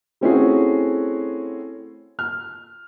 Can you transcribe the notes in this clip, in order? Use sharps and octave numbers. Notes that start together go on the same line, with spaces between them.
A3 C4 C#4 E4 F#4 G#4
F6